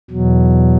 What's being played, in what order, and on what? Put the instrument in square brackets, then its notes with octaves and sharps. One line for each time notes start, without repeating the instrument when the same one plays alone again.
[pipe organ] E2 B2 F#3